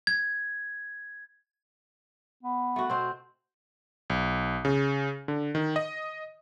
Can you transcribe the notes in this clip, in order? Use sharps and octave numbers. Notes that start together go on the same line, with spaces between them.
G#6
B3
A3 F#4
B2 C4 C5
B1
C#3
D3
D#3
D#5